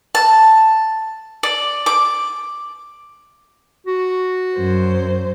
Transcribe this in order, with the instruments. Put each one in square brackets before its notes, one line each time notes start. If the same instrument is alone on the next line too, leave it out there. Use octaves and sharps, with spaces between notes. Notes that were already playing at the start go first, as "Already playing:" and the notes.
[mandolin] A5
D5
D6
[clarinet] F#4
[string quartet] F#2 C5